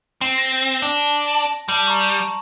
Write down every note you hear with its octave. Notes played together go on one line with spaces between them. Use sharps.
C4
A#6
D4 A5
G3 A5 F#7
A#5 C#6